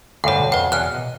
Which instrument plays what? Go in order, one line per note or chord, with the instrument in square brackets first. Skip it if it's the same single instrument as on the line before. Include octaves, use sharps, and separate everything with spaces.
[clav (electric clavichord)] D2 G2 [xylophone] C#5 F5
[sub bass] B2
[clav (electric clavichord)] F2 [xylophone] B4 F#5
[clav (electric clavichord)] E2 [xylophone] F6 F#6
[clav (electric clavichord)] D#5